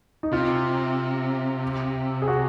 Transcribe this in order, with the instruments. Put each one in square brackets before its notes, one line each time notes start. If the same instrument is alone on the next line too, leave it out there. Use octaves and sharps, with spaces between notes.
[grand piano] D#4
[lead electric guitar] C3 [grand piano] F4
[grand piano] G#4
F#4